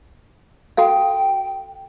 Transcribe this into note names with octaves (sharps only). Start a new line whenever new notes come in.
F#4 A4 F5 G5